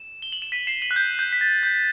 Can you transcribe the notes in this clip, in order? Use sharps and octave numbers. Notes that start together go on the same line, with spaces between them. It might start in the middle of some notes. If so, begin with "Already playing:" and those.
Already playing: E7
G7
F#7
E7
B6 D#7
C7 E7
D#7 F#7
F#6
G6
G6
B6
A6
G6